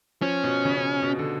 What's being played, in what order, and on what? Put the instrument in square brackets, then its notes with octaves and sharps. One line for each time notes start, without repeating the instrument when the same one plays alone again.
[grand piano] F3 [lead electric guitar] C#4
[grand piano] B2
C#3
B2
D3